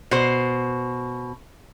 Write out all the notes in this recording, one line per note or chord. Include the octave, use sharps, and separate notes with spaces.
B2 C5